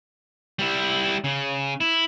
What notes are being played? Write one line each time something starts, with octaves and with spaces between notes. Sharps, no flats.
G3 E4
C#3
E4